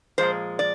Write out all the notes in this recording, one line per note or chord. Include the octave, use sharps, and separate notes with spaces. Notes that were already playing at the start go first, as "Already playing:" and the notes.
A#2 F3 G#3 C5
D5